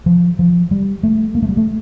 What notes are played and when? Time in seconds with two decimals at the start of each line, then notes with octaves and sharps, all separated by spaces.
0.06 F3
0.39 F3
0.71 G3
1.03 A3
1.35 A#3
1.42 A3
1.49 G3
1.57 A3